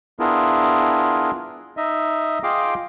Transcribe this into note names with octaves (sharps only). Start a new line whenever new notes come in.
B3 D4 E4 F4 G#4 A#4
D#4 D#5 E5
F4 G#4 D#5 F5 G5 D6